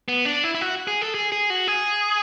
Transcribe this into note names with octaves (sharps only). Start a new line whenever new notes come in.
B3
D4
E4
E4
F#4
G#4
A4
G#4
G#4
F#4
G#4